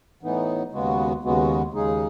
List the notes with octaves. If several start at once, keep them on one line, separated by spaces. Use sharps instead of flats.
A2 E3 B3 D#4
D#2 C#3 G#3 B3 F#4
D#2 C#3 G#3 B3 F#4
D#2 C#3 G#3 D#4 G#4